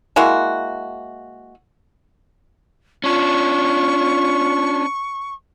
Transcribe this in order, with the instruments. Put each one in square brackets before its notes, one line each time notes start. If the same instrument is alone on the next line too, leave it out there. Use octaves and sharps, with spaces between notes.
[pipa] G#3 A#3 E4 F#4
[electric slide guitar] C#4 D4 [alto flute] F4 [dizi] C#6